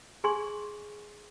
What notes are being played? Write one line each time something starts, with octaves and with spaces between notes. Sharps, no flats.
G#4 G#5 C6 C#6